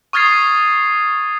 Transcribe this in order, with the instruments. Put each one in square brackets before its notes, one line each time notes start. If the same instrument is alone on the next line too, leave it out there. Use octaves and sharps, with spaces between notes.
[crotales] C#6 D#6 F6 G#6 A6 C7